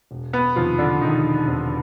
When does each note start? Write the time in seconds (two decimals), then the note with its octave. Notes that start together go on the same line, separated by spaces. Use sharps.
0.11 E1
0.33 B3 B4
0.55 E2 C3 D#3 F3 F4
0.78 D3 D4
1.01 E1 D#3 D#4
1.47 E2 C3 D#3